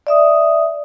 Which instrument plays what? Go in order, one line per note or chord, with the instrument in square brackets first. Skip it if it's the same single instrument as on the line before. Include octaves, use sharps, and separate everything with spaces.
[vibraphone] D5 E5 D#6